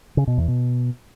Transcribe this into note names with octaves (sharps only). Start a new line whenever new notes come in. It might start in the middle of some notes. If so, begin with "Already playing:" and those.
C#3
B2
E2
B2